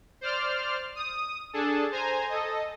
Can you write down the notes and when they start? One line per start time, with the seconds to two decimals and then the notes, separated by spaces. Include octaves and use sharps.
0.21 C5 D5 F6
0.95 D#6
1.53 D4 G#4 A4 A5
1.92 C5 G#5 A#5
2.29 A4 D#5